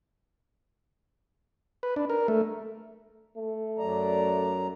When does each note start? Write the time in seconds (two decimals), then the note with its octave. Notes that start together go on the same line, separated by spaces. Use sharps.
1.83 B4
1.96 D4
2.10 A#4
2.28 A3
3.37 A3
3.79 F#2 F#3 D5 A#5